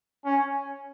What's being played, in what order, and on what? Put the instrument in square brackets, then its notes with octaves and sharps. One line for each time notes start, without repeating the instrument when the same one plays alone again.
[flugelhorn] C#4